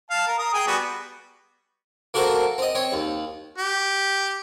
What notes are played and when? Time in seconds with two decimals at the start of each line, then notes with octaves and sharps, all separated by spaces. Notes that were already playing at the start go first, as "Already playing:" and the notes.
0.10 F5 A5
0.27 A#4
0.39 A#4 D#6
0.54 G#4 G5 G#5
0.67 G3 B3 F#4
2.14 A#3 F#4 A4 A#4 C5
2.58 C4 D#5
2.75 C4 C#5
2.93 D#2
3.58 G4